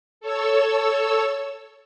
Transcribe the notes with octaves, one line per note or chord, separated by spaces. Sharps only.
A4 C#5 E6